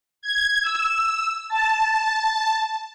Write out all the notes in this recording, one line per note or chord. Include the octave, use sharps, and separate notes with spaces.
G#6
E6
A5